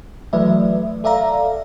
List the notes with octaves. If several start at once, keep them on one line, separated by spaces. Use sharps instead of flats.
E3 F#3 A3 B4 D5 E5
A4 D5 E5 F5 A#5